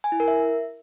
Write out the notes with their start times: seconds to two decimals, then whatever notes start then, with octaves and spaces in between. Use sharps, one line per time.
0.04 G#5
0.12 E4
0.20 A#4
0.28 E5